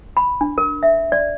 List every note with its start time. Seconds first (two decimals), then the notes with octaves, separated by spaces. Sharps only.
0.17 B5
0.41 D4
0.58 A#4
0.83 E5
1.12 D5